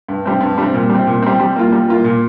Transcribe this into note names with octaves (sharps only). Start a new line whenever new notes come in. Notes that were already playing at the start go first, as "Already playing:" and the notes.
G2
G3 C4
G2
G3 C4
A#2
G3 C4
A#2
G3 C4
G3
A#3 F4
G3
A#3 F4
A#2